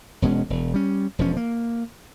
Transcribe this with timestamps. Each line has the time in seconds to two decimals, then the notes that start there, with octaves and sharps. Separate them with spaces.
0.22 E1 B2 G#3 C#4
0.50 E1
0.74 G3 C#4
1.19 E1 F3 C#4
1.37 A#3